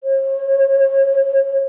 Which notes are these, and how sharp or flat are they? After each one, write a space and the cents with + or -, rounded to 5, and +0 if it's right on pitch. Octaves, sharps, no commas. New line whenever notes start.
C#5 -40